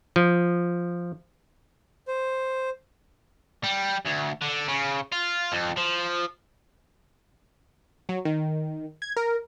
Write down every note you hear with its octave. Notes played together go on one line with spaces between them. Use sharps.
F3
C5
G3
D2
D3
C#3
F4
F2
F3
F#3
D#3
G#6
A#4